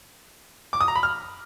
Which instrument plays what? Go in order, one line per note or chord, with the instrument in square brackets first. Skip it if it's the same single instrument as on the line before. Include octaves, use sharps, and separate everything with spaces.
[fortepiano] D6
D#6
A#5
B5
F6